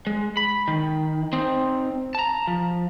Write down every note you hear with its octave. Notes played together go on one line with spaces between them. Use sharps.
G#3
B5
D#3
C4 D#4
A5 A#5
F3